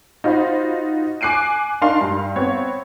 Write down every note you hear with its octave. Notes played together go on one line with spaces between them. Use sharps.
D#4 F4 F#4 C5 B5
G#5 D6 F#6 C7 D7 D#7
D4 D#4 A#4 F5 C6
G2
B3 C4 C#5